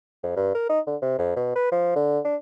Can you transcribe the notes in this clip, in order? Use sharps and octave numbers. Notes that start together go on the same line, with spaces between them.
F2
G2
A#4
D#4
D3
C3
F2
B2
B4
F3
D3
D4